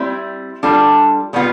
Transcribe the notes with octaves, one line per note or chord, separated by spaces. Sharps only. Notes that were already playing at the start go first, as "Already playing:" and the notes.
Already playing: G3 C4 E4
G3 D4 F4 A4
B2 G3 B3 F4